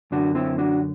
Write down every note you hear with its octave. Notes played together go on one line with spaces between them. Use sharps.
F#2 D3 D4 F#4
C4 E4
D4 F#4